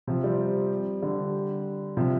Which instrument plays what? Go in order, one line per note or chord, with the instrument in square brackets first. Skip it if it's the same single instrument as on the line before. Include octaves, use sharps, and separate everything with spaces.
[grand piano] C3 F3
G3 C4
D3 G3
C3 F3